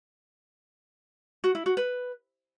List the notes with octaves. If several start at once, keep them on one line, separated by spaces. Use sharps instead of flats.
F#4
E4
F#4
B4